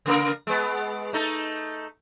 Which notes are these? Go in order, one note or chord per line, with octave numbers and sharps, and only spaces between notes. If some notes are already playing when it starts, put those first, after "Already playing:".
C#3 A#3 A#4
G#3 B3
A3 D#4 A4